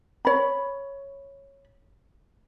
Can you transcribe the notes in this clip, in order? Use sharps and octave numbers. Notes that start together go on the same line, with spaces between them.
C#5 B5